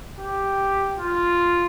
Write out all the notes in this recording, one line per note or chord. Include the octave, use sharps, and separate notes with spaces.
G4
F4